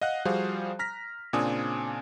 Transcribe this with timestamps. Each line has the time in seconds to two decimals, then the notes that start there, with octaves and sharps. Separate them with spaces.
0.01 D#5 F5 F#5 F#6
0.25 F3 G3 F#4 G#4 C5 F5
0.79 A#5 F6 A#6 B6
1.33 A#2 C#3 C4 D4 G#5 D#6